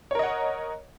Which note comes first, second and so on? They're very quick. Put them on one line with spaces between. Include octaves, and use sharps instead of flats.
C#5 A#4 D#5 F#5